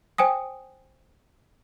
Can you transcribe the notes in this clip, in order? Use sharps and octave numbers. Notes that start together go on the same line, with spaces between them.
C5 G5 G#5 D#6